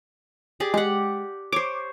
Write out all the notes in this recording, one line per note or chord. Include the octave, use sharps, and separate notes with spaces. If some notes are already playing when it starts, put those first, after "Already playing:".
G4 G#4 D5
G#3 G4 F#5
C5 C#5 D6